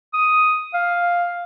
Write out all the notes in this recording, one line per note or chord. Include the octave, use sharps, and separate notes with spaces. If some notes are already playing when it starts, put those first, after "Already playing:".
D#6
F5